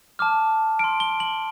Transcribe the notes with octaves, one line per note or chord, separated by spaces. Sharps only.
A5 D6 F6
C6 F6 D7
G7
F#7